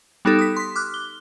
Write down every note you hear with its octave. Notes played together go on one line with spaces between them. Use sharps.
G3 B3 D#4 G4 A4
D#6 B6
C6 B6
D6 F6 F#6
G7